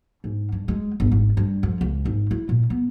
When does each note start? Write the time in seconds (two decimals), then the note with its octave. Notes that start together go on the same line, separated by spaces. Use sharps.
0.24 G#2
0.52 G2
0.68 G#3
1.00 G1
1.12 G#1
1.37 G2
1.63 F2
1.81 C#2
2.05 G#1
2.31 E4
2.49 A#2
2.70 B3